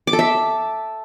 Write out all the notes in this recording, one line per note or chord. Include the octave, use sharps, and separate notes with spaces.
D6
A4
E5